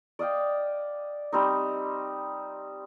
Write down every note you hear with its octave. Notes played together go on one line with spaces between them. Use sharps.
D5 D#5 F5 G5
G3 C4 D#4